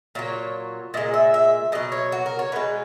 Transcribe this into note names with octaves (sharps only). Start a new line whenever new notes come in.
A#2 F#3 C#5
A#2 G#3 D#5
E5
E5
B2 F#3 D#5
C#5
F#4
A#4
C#5
B2 G#3 B4